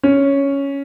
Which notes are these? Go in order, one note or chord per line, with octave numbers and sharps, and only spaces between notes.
C#4